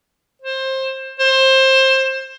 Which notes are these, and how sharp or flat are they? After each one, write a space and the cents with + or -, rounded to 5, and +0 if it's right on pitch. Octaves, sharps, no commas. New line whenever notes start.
C5 +20
C5 +20